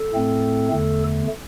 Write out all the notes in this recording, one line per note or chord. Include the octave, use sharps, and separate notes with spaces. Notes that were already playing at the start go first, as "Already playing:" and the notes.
Already playing: A4
A2 A3 C4
E2 D3 A3